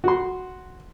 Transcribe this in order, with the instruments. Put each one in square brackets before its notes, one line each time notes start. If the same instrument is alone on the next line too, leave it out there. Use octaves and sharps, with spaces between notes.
[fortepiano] F#4 C6